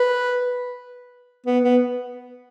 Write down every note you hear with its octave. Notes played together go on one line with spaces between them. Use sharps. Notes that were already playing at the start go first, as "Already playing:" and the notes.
Already playing: B4
B3
B3